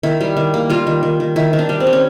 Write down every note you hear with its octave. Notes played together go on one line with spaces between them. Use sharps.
D#3 E4
G3
D#3
A#3
G3 F4
D#3
D#3
D#3
D#3 E4
D#3
D4
G3
C4
G3
C#4